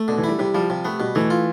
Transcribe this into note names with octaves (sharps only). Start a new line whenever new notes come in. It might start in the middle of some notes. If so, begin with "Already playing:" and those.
Already playing: A3
B2 D3
E3
G3 E4
C3 G3
F3 G3
C3 F3
A3 B3
B2 G3
E3 A3
F4